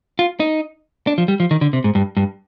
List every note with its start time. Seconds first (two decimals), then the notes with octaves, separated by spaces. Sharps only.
0.19 F4
0.40 D#4
1.07 D4
1.18 F3
1.28 G3
1.40 F3
1.51 D#3
1.61 D3
1.73 C3
1.84 G#2
1.95 G2
2.17 G2